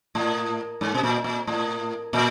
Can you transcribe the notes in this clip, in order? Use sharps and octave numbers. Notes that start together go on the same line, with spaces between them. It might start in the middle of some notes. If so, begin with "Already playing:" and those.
A2
G#2
B2
A#2
A#2
A2
A#2